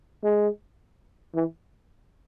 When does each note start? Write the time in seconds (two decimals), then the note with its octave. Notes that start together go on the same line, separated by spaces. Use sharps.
0.23 G#3
1.35 E3